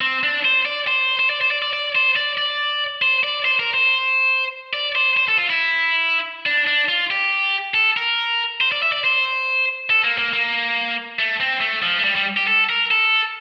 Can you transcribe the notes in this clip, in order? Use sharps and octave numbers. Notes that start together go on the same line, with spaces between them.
C4
D4
C5
D5
C5
C5
D5
C5
D5
D5
D5
C5
D5
D5
C5
D5
C5
A#4
C5
D5
C5
C5
A4
F4
E4
D4
D4
F4
G4
A4
A#4
C5
D5
E5
D5
C5
A4
A#3
A#3
A#3
A3
C4
A3
F3
A3
G3
G3
G4
A4
A#4
A4